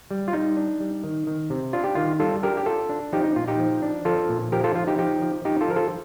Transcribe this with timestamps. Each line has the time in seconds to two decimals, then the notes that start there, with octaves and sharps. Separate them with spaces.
0.11 G3
0.28 F4
0.33 G3 D#4
0.57 D4
0.80 G3
1.04 D#3
1.27 D#3
1.50 C3
1.73 D4 F4
1.84 G4
1.95 D#3 F4
2.20 G3 F4 A4
2.43 D4 G4 A#4
2.57 G4
2.66 D4 F4 A4
2.89 D4
3.13 F3 D#4 G4
3.24 D#4
3.36 A#2 F4
3.48 D#4 G4
3.59 F3
3.82 D4
4.05 F3 F4 A4
4.29 A#2
4.52 F3 G4 A#4
4.64 F4 A4
4.75 F3 F4
4.87 D#4 G4
4.98 F3 D#4 G4
5.22 F3
5.45 F3 D#4 G4
5.61 F4 A4
5.68 F3 A#4
5.76 F4 A4